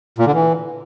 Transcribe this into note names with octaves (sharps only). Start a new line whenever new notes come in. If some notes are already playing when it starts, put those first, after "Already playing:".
A#2
D3
E3